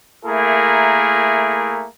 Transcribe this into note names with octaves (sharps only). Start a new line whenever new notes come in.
A3 A#3 E4 G#4 A#4